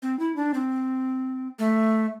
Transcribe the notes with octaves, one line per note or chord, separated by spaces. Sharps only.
C4
E4
D4
C4
A3